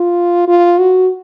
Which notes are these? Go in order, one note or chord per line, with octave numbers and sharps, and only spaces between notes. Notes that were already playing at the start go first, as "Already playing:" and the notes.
Already playing: F4
F4
F#4